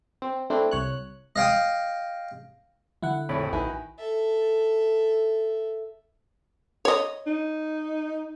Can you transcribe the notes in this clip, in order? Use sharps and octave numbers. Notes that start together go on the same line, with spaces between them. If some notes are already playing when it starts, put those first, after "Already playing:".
C4
A3 C4 D4 E4
C2 C#5 F#6
D#5 F5 G5 D#6
D3 E4 F#5
A#1 F2 A2 E4 C#5 B5
A#1 D#3 E4 F#4 B4 G#5
A4 E5
C#5 D#5
D#4